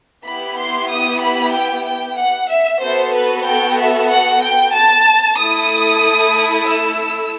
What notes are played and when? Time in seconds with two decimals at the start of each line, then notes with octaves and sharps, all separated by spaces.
0.24 B3 E4 G4 B5
0.57 C6
0.90 D#6
1.21 B5
1.53 G5
1.85 G5
2.17 F#5
2.49 E5
2.81 B3 F#4 A4 C5
3.13 B4
3.45 G5
3.78 E5
4.09 F#5
4.42 G5
4.74 A5
5.38 A3 E4 A4 D#6
6.66 E6